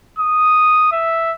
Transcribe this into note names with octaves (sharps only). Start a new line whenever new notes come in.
D#6
E5